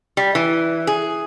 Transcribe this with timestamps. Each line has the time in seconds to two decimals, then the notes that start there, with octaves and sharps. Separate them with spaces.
0.17 G3
0.35 E3
0.87 G#4